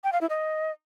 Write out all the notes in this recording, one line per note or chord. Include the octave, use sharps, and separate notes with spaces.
G5
F5
E4
D#5